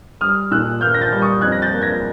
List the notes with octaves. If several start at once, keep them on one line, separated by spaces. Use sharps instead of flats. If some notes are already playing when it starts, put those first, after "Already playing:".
G3 D#6 F6
A#2 E6 F#6
A#3 F6 G6
A#6
G6 A6
G3
C#6 D#6
F2 F#6 G#6
A#6
G6 A6
A#3
G#6 A#6